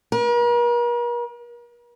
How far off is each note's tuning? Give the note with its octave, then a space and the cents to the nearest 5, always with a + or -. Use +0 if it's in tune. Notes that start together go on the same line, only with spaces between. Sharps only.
A#4 +45